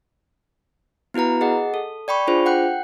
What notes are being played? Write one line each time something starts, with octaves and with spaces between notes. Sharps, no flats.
B3 E4 F#4 B4 A#5
G#4 D#5 F#5
A4
D5 G5 B5 C#6
D4 F4 G#4 C5
F#5 G5 F#6